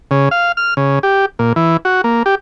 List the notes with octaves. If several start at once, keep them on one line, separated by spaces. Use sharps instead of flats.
C#3
F5
F6
C#3
G4
A#2
E3
F#4
A#3
G4